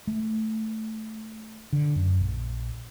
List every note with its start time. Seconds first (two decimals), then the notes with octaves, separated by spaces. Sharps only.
0.07 A3
1.73 D3
1.96 F#2
2.21 A#1